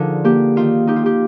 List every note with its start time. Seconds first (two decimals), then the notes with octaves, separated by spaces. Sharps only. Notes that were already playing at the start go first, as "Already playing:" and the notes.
Already playing: D3 F3 D#4 F4 G#4 A#4
0.24 A#3 G4
0.56 D#3 F4
0.87 D#4 G4
0.96 F4
1.06 G4